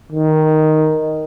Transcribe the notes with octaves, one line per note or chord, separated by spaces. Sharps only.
D#3